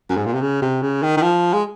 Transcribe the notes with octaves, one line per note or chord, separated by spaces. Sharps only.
F#2
G#2
A#2
C3
C#3
C3
C#3
D#3
D#3
F3
G#3